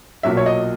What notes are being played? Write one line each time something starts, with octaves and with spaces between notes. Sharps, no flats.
B1 A#2 F#3 E5
C#5
D#5